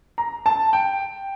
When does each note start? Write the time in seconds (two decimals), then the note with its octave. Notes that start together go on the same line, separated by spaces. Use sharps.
0.18 A#5
0.46 A5
0.73 G5